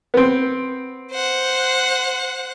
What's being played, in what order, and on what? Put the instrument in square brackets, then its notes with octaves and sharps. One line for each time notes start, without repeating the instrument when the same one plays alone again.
[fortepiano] B3 C4
[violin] C5 F#5